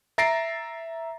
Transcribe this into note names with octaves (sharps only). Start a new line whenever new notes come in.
E5 A#5 A6 A#6 C7 D7